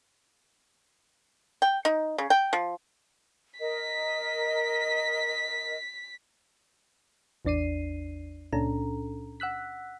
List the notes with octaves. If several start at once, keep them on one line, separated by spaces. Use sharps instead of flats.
G5
D#4
C#3
G5
F3
A#4 D#5 B6
A1 E2 D4 D5 C7 D#7
C#2 A#2 C#4 D4 A4 A#5
F#5 E6 F#6 B6